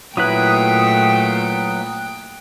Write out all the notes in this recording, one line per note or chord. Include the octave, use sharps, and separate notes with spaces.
A#2 F#3 A3 E4 B4 G5 D#6 F#6